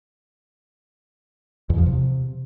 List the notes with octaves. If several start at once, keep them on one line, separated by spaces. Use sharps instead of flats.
E2
F3
C3